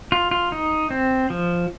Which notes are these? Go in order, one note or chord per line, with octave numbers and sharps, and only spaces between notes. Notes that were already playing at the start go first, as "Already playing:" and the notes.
F4
F4
D#4
C4
F3